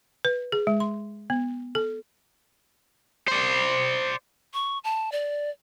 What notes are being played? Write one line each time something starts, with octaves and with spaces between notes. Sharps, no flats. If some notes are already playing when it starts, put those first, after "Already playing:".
B4
G#4
G#3
C6
B3
A4
C5 D5
C#6
A5
D5